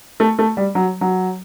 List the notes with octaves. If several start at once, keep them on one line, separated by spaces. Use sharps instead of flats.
A3
A3
G3
F#3
F#3